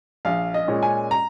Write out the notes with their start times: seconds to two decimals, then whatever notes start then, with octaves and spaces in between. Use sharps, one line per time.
0.25 A#1 F5
0.54 D#5
0.68 A#2 G#3 C#4
0.83 G#5
1.11 A#5